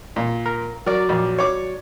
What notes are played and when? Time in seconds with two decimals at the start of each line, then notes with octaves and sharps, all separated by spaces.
0.16 A#2
0.46 A#4
0.86 F#3 A#4 D5
1.09 A#1
1.39 C#5 D6